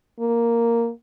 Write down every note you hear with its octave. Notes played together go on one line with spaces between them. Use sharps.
A#3